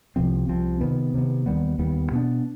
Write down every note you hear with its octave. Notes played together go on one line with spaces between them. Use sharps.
C2 C3 F3 C4
C2 C3 F3 C4
C3 D#3 B3
C3 D#3 B3
D#2 D#3 G3 B3
D#2 D#3 G3 B3
B2 B3 D4